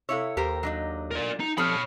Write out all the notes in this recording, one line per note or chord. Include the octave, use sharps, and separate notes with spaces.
C3 E4 A4 C#5 F5 E6
D#2 G4 A#4 C5
F#3 D4 D#4
A#4 D5
D#4
F3 G3 C4 A4 C#5 B5 D#6 F6